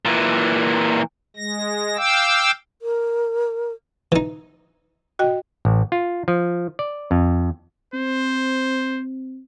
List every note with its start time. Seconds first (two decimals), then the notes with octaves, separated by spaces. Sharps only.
0.05 A#2 E3
1.36 G#3 A#6
1.97 F5 G5 D6 E6
2.82 A#4
4.12 E3 D#4
5.19 F#4 D#5 G5
5.65 A1
5.92 F4
6.28 F3
6.79 D5
7.11 F2
7.94 C4 C5